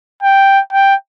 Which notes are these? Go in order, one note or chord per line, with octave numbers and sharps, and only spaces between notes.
G5
G5